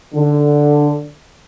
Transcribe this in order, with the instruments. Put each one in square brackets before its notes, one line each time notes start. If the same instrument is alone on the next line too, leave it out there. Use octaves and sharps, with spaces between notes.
[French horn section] D3